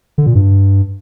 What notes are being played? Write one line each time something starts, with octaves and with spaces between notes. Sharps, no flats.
D3
A#2
G2